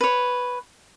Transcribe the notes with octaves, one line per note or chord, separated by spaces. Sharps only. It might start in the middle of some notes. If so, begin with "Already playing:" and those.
B4 C#5